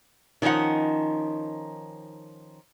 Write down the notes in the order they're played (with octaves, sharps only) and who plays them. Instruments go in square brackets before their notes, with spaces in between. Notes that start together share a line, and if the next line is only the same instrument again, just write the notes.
[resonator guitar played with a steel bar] D#3 F3 C#4 D#4 F#5